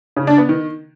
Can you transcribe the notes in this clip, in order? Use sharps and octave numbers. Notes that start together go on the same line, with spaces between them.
C#3
D4
B3
D#3